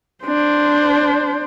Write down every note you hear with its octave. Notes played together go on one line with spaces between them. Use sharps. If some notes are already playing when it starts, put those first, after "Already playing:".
D4 C5